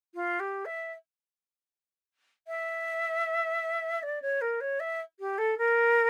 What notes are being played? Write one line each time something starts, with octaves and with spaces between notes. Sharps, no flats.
F4
G4
E5
E5
D5
C#5
A#4
C#5
E5
G4
A4
A#4